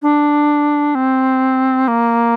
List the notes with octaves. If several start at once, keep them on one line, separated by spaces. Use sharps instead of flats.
D4
C4
A#3